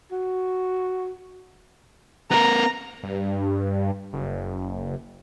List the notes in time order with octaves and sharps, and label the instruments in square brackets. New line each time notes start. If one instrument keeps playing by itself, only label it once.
[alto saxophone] F#4
[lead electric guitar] B3 A#4 [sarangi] A#5
[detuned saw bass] G2
F#1